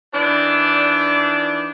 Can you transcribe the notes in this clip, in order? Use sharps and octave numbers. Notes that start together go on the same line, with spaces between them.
D#3 E3 D4